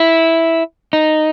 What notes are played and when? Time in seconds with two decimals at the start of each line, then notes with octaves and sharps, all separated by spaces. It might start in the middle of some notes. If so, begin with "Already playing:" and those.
Already playing: E4
0.93 D#4